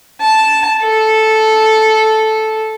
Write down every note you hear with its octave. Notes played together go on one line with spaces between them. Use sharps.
A5
A4